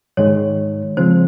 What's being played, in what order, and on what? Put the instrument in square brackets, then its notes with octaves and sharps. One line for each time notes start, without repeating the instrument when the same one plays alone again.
[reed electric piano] G#2 D#3 G#3 [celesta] C#5
[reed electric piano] C#3 F3 G#3 C4 [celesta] C5